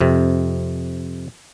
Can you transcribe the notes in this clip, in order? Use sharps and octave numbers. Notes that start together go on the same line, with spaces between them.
F2 C3